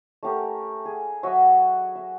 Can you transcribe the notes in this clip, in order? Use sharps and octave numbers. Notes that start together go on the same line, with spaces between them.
A3 C#4 G4 A#4
G#4
F#3 F#4 D#5 E5
E5